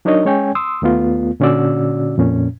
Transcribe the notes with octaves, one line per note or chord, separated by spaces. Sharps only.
F#3 D4 D#4 A#4 C#5 D#5
G#3 C#4 C#5 G5 G#5
C6 D#6 E6
D#2 A3 B3 F4
A#2 D3 C#4 F#4 D5 E6
F2 A#2 C#4